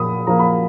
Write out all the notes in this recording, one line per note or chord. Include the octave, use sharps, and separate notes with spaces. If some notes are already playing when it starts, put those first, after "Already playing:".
Already playing: A#2 F3 A#3 B5 D#6
F3 A#3 A#5
B5